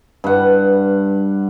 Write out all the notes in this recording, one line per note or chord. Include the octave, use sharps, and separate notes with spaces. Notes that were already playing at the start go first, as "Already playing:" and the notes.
G2 F#5